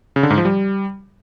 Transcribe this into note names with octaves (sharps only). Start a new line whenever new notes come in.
C#3
D3
G#2
F3
G3